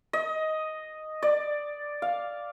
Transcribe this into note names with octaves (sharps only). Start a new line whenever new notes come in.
D#5
D5
F5